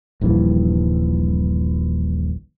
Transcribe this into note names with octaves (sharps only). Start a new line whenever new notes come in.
D#1 A#1 G2 E3